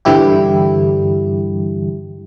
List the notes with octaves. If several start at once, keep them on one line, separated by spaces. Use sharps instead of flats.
G2 D3 E3 G3 E4 G4